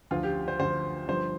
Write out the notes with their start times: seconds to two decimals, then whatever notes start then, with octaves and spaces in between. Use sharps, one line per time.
0.11 D2 D3 F3 F4
0.23 G4
0.48 C5
0.59 D2 D3 F3 C5
1.08 G1 G2 F3 C5